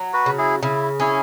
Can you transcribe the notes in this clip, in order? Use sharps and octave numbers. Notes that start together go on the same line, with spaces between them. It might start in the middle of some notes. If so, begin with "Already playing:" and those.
Already playing: F#3
F#4 B4
C#3
E4 G#4
C#3 E4
C#4 E4 G#4